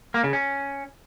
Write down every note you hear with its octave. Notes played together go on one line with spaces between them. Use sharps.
A#3
C#3
C#4